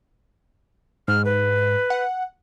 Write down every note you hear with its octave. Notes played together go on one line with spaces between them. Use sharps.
G#2 F6
B4
F#5